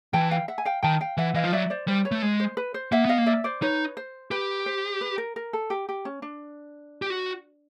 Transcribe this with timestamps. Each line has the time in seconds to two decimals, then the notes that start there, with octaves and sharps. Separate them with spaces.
0.13 E3 G5 A5
0.31 F5 G5
0.48 E5 F#5
0.58 G#5
0.65 F5 G5
0.83 D#3 G5 A5
1.01 F5 G5
1.17 E3 E5 F#5
1.34 E3 D#5 F5
1.44 F3
1.52 F#3 D5 E5
1.70 C5 D5
1.88 G3 C5
2.05 B4 C#5
2.11 A3
2.22 G#3
2.40 C5
2.57 B4
2.74 C5
2.92 A#3 E5 F#5
3.05 B3 D#5 F5
3.18 A#3
3.26 D5 E5
3.44 C5 D5
3.62 D#4 B4 C#5
3.97 C5
4.31 G4 B4
4.66 C5
5.01 B4
5.18 A#4
5.36 A#4
5.53 A4
5.70 G4
5.89 G4
6.05 C#4
6.22 D4
7.02 G4
7.10 F#4